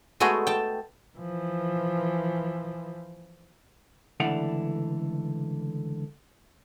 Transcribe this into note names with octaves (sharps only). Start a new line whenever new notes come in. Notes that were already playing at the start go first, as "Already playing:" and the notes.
G#3 A3 B3 F#4 G#4 D#5
G5 A5
E3 F3
C#2 D3 E3 A3 D5 F#5